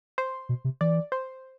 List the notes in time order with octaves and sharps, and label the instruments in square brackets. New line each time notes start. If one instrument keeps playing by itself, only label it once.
[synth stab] C5
[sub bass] B2
C3
[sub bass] E3 [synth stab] D5
[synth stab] C5